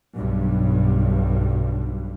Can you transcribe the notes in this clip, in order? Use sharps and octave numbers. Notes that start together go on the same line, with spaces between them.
B1 G2